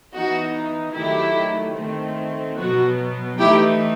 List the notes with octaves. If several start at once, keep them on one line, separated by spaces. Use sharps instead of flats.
E3 B3 D#4 F#4
D#3 F#3 A3 E4 G4
D#3 A3 C4
B2 F#3 B3 F#4
E3 A3 D#4 E4 G4